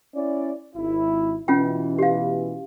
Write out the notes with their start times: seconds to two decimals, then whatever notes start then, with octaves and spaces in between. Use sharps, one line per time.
0.15 C#4 E4 D5
0.76 G#1 E4
1.48 B2 E3 C#4 F4 G5
1.99 G4 F5